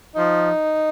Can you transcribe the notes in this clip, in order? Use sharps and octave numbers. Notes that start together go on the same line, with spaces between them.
F3 D#4